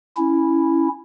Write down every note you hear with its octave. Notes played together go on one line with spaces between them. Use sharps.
C#4 E4